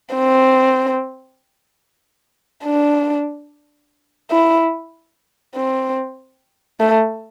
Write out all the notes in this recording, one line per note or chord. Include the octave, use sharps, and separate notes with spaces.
C4
D4
E4
C4
A3